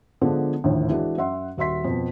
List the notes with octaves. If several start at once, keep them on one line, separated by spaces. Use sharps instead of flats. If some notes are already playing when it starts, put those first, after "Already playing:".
D3 F3 G#3 B3 D4 A4
A#1 D#2 A2 D3
E3 G#3 D4 F#4
F#2 E5 F#5 C6
D#1 F#4 E5 C6 B6
F2 B2